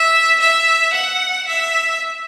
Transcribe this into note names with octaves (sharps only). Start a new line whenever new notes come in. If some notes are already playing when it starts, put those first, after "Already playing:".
Already playing: E5
E5
F#5
E5